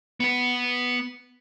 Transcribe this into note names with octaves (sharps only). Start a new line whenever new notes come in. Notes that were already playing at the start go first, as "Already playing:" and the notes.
B3 B4